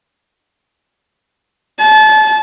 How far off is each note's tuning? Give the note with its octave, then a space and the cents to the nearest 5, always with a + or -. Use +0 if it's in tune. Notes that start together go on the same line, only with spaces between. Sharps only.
A5 -30